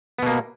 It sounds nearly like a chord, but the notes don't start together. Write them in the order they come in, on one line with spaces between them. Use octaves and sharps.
B3 B2 A#3